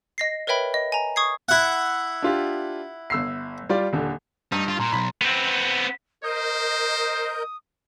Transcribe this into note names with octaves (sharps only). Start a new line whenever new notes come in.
D#5 A#6 C7
A#4 B4 C#5 E5 G5 B5
D#5
G#5 A#5
C#6 D#6 G#6 C7
E4 F#5
D4 F4 G4
G1 E6 C7
G3 F4 D5
D#1 D3
G2 D#4
F4
A#2 A#5 C6
B1 B5
B3 C4
A#4 C5 D#5 D#6 G6